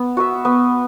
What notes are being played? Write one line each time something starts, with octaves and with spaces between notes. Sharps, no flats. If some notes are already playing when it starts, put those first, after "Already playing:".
Already playing: B3
F#4 B4 E5
B3